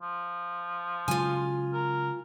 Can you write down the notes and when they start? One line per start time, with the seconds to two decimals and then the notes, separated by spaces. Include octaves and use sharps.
0.02 F3
1.08 C#3 F#3 G#3 F4 G#5
1.73 A#4